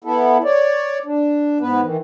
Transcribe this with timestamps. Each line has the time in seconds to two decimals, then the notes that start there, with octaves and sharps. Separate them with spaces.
0.04 B3 E4 A4
0.44 C#5 D5
1.06 D4
1.61 G#2 B3 B4
1.82 D#3 E3